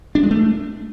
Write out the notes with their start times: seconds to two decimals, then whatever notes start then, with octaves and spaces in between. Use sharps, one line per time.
0.15 D4
0.23 G#3
0.31 A3